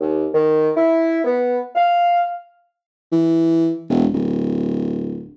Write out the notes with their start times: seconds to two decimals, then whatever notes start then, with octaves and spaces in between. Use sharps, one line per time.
0.01 D#2
0.33 D#3
0.76 E4
1.25 B3
1.75 F5
3.12 E3
3.89 E1
4.14 D1